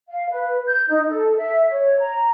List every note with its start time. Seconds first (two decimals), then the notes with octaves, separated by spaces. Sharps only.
0.10 F5
0.30 B4
0.66 G6
0.88 D#4
1.09 A4
1.37 E5
1.70 C#5
2.00 A#5